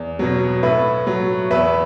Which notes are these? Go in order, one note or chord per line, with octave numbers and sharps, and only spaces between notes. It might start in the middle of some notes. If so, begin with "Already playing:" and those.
Already playing: E2
B2 F#3
A2 B4 E5
F#3
E2 B4 E5